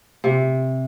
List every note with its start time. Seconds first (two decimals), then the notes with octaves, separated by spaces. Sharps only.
0.24 C3